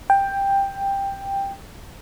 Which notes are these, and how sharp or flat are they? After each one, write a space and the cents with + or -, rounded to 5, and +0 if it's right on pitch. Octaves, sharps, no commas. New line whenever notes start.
G5 +10